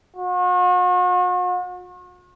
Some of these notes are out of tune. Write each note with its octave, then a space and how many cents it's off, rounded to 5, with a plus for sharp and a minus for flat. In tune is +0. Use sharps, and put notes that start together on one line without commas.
F#4 -40